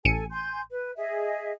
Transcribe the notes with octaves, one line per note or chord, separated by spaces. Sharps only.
A1 A4 G#5 C#7 D#7
G#5 C6 G6
B4
G#4 D#5 E5